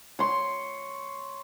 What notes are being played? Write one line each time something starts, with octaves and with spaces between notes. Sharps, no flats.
C#5 C6